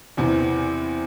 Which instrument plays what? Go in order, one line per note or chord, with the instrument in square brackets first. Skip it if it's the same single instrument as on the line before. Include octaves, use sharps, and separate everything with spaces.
[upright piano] E2 C3 E3